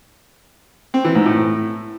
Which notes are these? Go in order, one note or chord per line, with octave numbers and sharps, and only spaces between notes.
C4
E3
G#2
A2